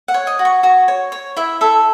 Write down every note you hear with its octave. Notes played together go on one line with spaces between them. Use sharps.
F#5
C#5
D#5
F#4
C#6
F#4 C#6
C#5
C#5
E4 E5
A4 E5